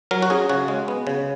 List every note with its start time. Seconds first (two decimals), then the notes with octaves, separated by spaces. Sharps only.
0.11 F#3 A#4
0.22 F#4
0.30 C#4 G#4
0.49 C#3 F#4
0.68 G#3
0.88 B3
1.07 C#3